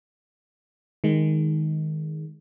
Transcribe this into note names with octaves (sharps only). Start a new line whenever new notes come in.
D#3 G#3